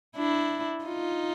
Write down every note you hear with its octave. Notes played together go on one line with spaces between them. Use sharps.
D4 E4
D#4 F4